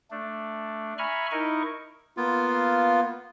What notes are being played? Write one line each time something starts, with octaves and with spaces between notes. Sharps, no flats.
A3 D4
E5 G#5 A#5 B5 C#6 F6
D#4 E4 A#4 D#5 C#6
A#3 B3 F4